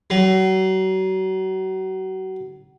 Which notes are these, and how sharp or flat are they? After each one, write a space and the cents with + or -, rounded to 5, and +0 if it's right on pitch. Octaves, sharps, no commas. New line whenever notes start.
F#3 +35